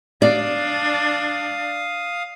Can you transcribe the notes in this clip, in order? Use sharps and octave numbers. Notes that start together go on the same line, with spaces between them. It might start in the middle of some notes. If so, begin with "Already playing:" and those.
D4 D5 F5 D#6